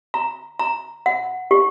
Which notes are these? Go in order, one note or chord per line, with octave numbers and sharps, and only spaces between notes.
A#5
A#5
F#5
G4